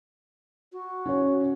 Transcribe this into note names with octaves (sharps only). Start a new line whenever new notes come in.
F#4
C#4 C#5